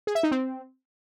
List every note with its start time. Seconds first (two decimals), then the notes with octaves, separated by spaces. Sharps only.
0.07 G#4
0.15 E5
0.23 D#4
0.31 C4